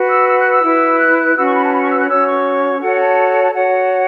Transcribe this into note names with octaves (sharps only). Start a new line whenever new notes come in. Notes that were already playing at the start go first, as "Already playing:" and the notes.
Already playing: F#4 B4
E6
E6
F#6
E6
E4 B4
F#6
F#6
C#4 F#4 B4 E6
C#6
B5
A5
B5
C#6
E6
F#6
C#4 F#4 C#5 E6
C#6
F#4 A4 C#5 F#5
A5
A5
F#4 C#5 F#5